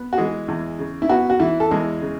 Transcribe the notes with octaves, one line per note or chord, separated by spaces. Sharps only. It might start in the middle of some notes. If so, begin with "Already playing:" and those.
Already playing: B3
F#4
E3 G#3 G#4
E2
C#3
E4
B3 F#4
F#4
E3 E4
A4
E2 G#3 G#4
C#3